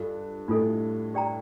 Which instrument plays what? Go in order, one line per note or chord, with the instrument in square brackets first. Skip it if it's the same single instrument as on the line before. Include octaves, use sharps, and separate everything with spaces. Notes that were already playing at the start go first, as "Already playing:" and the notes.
Already playing: [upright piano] G2 [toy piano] D4 F4 A4 D#5
[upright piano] A2 [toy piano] D4 F4 A4 D#5
[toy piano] G4 D5 G5 A#5